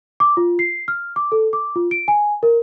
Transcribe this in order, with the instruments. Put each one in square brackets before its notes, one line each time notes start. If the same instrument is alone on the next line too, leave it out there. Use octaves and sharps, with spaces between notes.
[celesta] D6
F4
C7
F6
D6
A4
D6
F4
D7
G#5
A#4